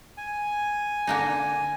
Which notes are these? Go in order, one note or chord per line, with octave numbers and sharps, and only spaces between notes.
G#5
D3 A#3 D#4